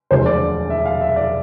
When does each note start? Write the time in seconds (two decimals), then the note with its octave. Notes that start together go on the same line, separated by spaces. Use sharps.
0.11 E1 D2 D3 F3 C5
0.26 D5
0.70 E5
0.85 F5
1.01 E5
1.16 D5